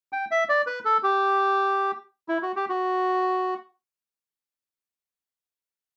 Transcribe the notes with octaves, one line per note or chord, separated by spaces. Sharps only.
G5
E5
D5
B4
A4
G4
E4
F#4
G4
F#4